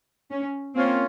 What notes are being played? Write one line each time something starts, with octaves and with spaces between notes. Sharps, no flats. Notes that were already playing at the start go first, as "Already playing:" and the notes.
C#4
A#3 C4 C#4 F4